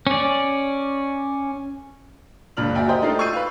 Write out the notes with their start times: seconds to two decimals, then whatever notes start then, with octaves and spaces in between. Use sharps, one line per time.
0.07 C#4 D5
2.57 F#1 C#2 A#2 D4 F6 F#7
2.75 F#4 D5 E5 G5 G#5
2.88 G4 A#4 C5 D#5 G5
3.01 A3 D4 D#4 F4 C7
3.19 C#6 E6 G6 C7 D#7
3.33 B4 F5